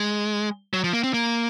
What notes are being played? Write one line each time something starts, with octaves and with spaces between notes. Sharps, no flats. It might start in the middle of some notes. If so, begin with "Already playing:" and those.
Already playing: G#3
F#3
F3
A#3
C4
A#3